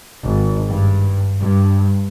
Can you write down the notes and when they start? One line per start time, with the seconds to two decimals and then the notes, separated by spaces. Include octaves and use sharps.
0.24 G#1
0.68 G2
1.40 G2